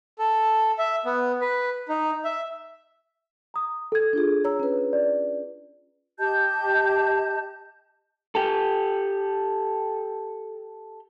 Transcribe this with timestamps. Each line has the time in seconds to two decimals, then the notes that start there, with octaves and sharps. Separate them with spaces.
0.19 A4
0.78 E5
1.05 B3
1.41 B4
1.89 D#4
2.25 E5
3.54 A#5 D#6
3.92 A4 G#6
4.13 D4 F4 G#4
4.45 C#5 A#5 E6
4.60 C#4 B4
4.93 D5
6.19 G4 D#5 A5 G6
8.35 G4 A4